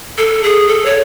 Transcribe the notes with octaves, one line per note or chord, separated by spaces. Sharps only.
A4
G#4
A4
C#5